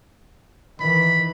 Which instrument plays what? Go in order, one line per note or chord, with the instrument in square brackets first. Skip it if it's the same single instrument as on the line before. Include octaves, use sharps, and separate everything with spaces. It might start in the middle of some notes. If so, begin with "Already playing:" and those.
[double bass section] D#3 E3 [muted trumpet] B5